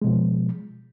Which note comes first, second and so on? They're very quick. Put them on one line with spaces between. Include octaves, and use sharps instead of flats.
G#3 B2 F3